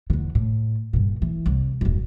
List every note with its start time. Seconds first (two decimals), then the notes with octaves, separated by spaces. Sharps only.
0.10 E2 D3
0.35 A2
0.93 G2 A#2
1.22 E3
1.46 C2
1.81 D#1 F#2